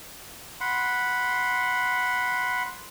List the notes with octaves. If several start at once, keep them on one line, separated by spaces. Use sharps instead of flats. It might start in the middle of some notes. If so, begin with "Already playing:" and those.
F#5 B5 C6